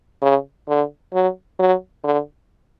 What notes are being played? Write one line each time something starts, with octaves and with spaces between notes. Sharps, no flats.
C#3
D3
F#3
F#3
D3